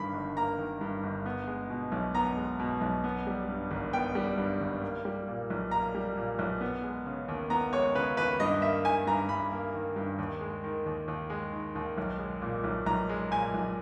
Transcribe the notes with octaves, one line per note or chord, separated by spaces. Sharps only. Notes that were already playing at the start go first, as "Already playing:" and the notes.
Already playing: G2 D#3 A#3 B5
G1
A#3 A#5
D#3
G2
G1
B3
G#3
B2
B1
B3 A#5
G#3
B2
B1
B3
G3
G2
G#1
B3 G5
G3
G2
G#1
A#3
G3
A#2
B1
A#3 A#5
G3
A#2
B1
B3
G#3
C#3
D#2
B3 A#5
G#3 C#5
C#3 B4
D#2 B4
G2 D#5
A#3 E5
D#3 G#5
G2 A#5
G2 B5
A#3
D#3
G2
D#2
G#3
D#3
D#2
D#2
G#3
D#3
D#2
B1
G#3
A#2
B1
B1 A#5
G#3
A#2 G#5
B1